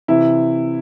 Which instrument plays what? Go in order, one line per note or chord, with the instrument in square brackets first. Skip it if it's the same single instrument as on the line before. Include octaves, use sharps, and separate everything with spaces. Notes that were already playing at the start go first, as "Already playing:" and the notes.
[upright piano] C3 E3 E4